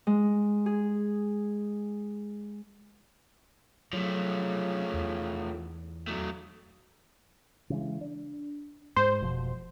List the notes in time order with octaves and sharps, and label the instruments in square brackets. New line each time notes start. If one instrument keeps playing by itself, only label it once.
[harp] G#3
G#4
[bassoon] C#3 [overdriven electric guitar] F3 A3 [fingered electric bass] F#3
[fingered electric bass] E2
[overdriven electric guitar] F#3 A3
[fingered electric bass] C#3 E3 G#3
D4
[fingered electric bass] G#2 [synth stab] C5
[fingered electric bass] F1 B2 F3